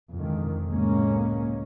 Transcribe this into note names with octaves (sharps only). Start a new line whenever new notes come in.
F2 D3 D#3 G#3
C#2 A2 G#3 A#3 C#4